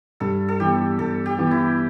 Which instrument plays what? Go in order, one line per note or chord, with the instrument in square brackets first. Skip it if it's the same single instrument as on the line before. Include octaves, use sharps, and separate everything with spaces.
[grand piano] G2 [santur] A4
[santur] A4
[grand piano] E3 B3 [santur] G4
[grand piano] G2 [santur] A4
[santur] G4
[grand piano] E3 B3
[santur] E4